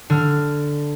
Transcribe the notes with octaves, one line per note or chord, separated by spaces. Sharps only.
D3 F6